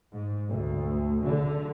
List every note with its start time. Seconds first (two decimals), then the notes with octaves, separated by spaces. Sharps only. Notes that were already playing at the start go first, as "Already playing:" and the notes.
0.11 G#2
0.50 D2
1.24 D3